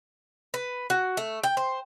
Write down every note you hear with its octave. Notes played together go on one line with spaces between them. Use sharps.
B4
F#4
A3
G5
C5